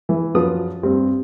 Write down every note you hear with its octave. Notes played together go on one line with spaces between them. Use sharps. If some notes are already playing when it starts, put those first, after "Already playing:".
E3
F#2 F3 F4 B4 D#6
G2 C4